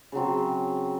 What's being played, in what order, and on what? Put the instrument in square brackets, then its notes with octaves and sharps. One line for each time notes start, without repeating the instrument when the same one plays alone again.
[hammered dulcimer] C#3 F#3 C4